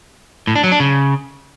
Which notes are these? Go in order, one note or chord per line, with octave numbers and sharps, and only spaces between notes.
A2
D4
F#3
D4
C#3